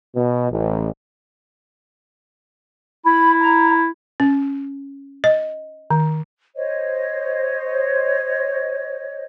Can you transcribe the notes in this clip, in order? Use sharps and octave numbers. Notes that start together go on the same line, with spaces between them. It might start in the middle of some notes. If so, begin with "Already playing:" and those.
B2
A1
E4 B5
A#5
C#4
D#5
D#3
C5 C#5 D#5